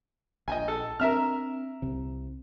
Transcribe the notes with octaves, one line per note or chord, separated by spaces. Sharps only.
A#1 D#5 G5 G#5
A4
C4 D4 A#4 E5 F6
C2 C3